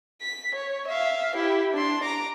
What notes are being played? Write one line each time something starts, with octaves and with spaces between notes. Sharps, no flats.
B6
C#5
E5 F5
E4 G4
D4 C6
A#5 D6